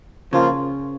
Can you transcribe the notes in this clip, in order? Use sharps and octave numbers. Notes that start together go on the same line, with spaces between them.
C#3 F3 A#3 F4